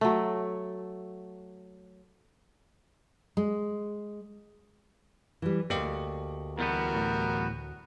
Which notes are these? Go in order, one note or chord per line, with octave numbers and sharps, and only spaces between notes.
F#3 A3
G#3
E3 G3
D2 B2 A#3 G4 D5 D#5
E2 G3 B3 F#4 A#4
A2